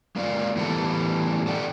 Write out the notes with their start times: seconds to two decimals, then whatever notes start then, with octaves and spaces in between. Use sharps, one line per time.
0.16 G#3 A#3 A#4 D5 F5
0.56 A2 E3 G3 B3 E4 A4
1.47 A4 D5 F#5 G5